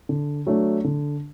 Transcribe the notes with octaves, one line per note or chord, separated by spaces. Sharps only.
D3
F#3 A3 D4
D3